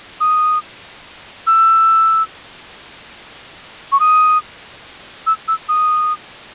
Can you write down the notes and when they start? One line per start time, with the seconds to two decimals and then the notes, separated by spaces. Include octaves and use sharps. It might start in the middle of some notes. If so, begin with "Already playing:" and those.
0.20 D#6
1.47 E6
3.92 C#6
4.00 D#6
5.27 E6
5.48 E6
5.69 D#6